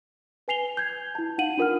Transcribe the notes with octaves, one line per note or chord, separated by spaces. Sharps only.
B4 G#5 C7 F7 G7
G6 G#6
E4 A5
D#4 F5 F#5 D#7 F#7
D4 F4 A#4 F#5 F6